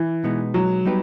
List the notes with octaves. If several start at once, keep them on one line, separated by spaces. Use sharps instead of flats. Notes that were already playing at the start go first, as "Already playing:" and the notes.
Already playing: E3
B2 G#3 B3 D#4
F#3
G3 B3 D#4 G4 B4